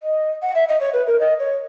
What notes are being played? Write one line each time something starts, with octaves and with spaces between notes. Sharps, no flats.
D#5
F#5
E5
D#5
C#5
B4
A#4
D#5
C#5